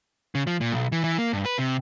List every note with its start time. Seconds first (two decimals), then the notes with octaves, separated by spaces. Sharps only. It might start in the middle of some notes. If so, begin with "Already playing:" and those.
0.35 C#3
0.47 F3
0.61 A#2
0.72 B1
0.92 E3
1.04 E3
1.18 A#3
1.33 G2
1.45 B4
1.59 C3